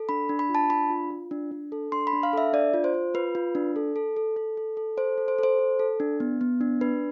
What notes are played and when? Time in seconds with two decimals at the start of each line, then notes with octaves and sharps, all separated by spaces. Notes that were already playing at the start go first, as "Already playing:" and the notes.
Already playing: A4
0.09 D4 B5
0.29 D4
0.39 B5
0.49 F4
0.55 A5
0.70 D4 B5
0.90 F4
1.10 F4
1.31 D4
1.51 D4
1.72 A4
1.92 D4 C6
2.07 B5
2.13 D4
2.23 F5
2.33 A4 E5
2.53 D4 D5
2.74 F4
2.84 C5
2.94 F4
3.14 F4 B4
3.35 F4
3.55 D4
3.76 A4
3.96 A4
4.16 A4
4.36 A4
4.57 A4
4.77 A4
4.97 A4 C5
5.18 A4
5.28 C5
5.39 A4 C5
5.59 A4
5.79 A4
6.00 D4
6.20 B3
6.41 B3
6.61 D4
6.81 D4 B4